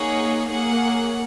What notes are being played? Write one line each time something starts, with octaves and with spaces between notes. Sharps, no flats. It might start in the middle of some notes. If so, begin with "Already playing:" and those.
Already playing: A#3 D#4 G#4 C#5 F#5
A#3 G#4 C#5 F#5